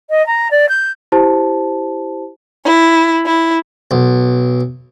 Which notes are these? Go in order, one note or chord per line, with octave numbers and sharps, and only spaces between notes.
D#5
A#5
D5
G6
E4 G4 C5 A5
E4
E4
B1